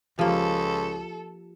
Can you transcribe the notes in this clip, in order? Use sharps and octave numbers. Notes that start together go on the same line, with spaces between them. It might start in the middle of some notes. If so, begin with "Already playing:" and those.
C#2 F3 A#3 F4 G4 A4